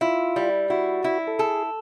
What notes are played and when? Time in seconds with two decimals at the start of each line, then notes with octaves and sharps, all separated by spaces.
0.01 E4 F4
0.36 G3
0.70 E4 F#4
1.04 E4
1.27 A4
1.39 G#4 A4